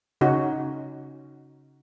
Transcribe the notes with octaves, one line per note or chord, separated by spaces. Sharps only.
C#3 C#4 D#4 F#4